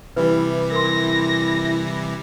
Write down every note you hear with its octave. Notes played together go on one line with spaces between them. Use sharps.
C3 E3 G3 E4 B4
A#4 C6 A#6